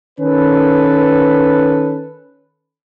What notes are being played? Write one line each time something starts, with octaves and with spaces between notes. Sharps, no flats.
D#3 C#4 A4 B4